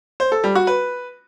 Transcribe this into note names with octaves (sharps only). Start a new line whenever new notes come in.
C5
A4
G3
F#4
B4